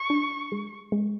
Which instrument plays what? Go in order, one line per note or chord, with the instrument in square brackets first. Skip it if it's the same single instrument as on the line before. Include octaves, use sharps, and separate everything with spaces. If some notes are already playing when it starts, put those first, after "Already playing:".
Already playing: [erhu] C#6
[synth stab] D4
G#3
G#3